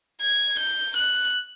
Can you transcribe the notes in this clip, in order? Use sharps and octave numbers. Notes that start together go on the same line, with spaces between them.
G#6
G6
F#6